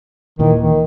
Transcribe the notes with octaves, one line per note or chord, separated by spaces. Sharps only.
D#2 A#2 D#3 E3
D#3